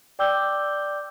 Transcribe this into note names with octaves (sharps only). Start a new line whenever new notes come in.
D5 G5 D6 E6 G6 G7